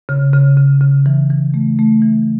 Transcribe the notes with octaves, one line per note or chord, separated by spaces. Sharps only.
C#3
C#3
C#3
C#3
E3
E3
A3
A3
E3